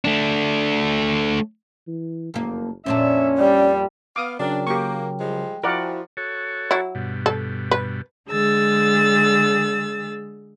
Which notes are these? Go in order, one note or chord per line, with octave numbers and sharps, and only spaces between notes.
A3 D4
E3
F#1 F2 A#3
F2 A#2 C#4 D4 E5
G3 D5
B3 F5 D6 D#6
C#3 F#3 D4 A#4 G5
A#3 G4 C#6
F3 G3 G#3
F3 E4 F#4 A#4 D5 F#5
F#4 A4 C#5
F#3 E4
G2 B2
A4
B4
D3 G#3 G#4 E6 A6